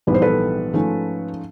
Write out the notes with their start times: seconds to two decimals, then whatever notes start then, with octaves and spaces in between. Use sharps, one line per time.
0.07 A#1 G#2 E3 G3 B3 B4
0.14 C5
0.22 A4 B4
0.74 G#2 F3 A3 C#4